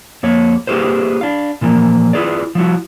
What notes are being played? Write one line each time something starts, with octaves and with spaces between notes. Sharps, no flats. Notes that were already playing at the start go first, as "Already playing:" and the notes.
F2 A#3 C#5
A#3 E4 G4 G#4 B4 C5
D4 F5
A#2 E3 F3 A#3
E4 F4 G#4 B4 D5
F3 G3 E4 F#4